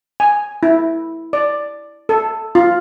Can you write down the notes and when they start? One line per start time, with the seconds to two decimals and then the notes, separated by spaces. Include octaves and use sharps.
0.20 G#5
0.63 E4
1.33 D5
2.09 A4
2.55 F4